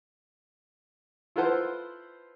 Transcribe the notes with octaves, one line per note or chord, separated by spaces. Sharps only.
E4 F4 A4 B4 C5 F#5